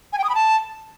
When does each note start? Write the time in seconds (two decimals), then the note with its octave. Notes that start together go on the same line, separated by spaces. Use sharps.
0.13 G#5
0.18 G5
0.24 D#6
0.29 B5
0.35 A5